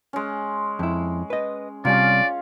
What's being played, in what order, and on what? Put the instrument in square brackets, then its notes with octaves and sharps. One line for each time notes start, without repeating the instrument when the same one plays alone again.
[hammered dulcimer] G#3 C#4
[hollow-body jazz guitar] F2 E4
B4 D#5
[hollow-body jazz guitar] C3 G3 [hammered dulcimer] C#4 F4 [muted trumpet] D5